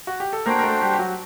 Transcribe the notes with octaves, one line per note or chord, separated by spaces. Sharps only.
F#4
G4
A4
A#3 D4 F#4 A#4 C5 G5
A#4
A3 A4
G3 G4
G4
F#3 F#4